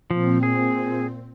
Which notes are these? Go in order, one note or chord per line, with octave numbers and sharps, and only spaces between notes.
A#2 F3 C4
G#4